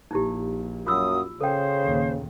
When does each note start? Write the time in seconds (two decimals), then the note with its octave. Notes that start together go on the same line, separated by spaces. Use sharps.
0.11 A#1 A#2 D#4 E4 G4
0.87 F#2 F#3 A#3 F4 D#6 E6
1.41 C#3 A4 C5 G5
1.82 D#2 A#2